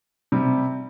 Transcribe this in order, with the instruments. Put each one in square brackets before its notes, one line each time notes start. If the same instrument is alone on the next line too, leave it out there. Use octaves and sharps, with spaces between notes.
[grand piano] C3 G3